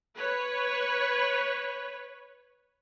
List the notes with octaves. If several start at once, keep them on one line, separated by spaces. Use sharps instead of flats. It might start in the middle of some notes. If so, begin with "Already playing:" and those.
B4 C#5